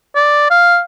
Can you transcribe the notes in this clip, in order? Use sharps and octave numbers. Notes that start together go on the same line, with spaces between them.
D5
F5